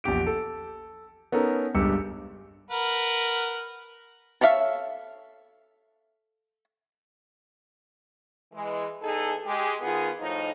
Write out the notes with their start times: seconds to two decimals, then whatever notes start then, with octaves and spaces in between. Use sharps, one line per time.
0.04 A#1 E2 G4 D7
0.27 A4
1.32 B3 C#4 D#4 A4 A#4
1.75 G1 C#2 G2 G4 E6 C#7
2.71 A#4 B4 F#5
4.41 A4 C#5 D5 E5 F5
8.54 E3 G#3
9.02 E2 D#4 G#4 A4
9.45 G#3 G4
9.81 D#3 B3 F4 G#4
10.20 A2 F3 D#4